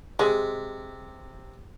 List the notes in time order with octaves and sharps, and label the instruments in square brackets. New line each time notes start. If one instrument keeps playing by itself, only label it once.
[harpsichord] C3 [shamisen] G#3